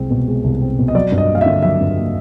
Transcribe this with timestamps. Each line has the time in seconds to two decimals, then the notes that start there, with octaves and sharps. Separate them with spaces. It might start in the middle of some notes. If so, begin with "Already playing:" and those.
Already playing: C2 G#3 C4
0.11 B2
0.28 G#3
0.44 C2
0.61 C4
0.79 B2
0.88 D#5
0.95 F#3 D5
1.12 G2
1.18 D#5
1.29 A#3
1.35 F5
1.41 D3 E5
1.62 F#3 E5
1.81 G2
1.97 A#3